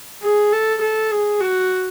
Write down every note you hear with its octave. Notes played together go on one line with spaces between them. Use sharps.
G#4
A4
A4
G#4
F#4